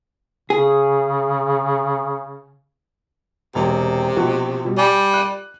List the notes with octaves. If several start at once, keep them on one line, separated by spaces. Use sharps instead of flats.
C#3 G#4
E1 C3
A#1 B2 F#4
B2 G3
G3 G#5
F#6 D#7